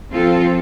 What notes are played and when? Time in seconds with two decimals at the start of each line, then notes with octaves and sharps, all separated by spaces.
0.10 F3 C4 F4 A4